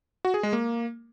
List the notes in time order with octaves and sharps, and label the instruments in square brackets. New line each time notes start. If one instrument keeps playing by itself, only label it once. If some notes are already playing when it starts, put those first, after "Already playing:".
[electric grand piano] F#4
G#4
G#3
A#3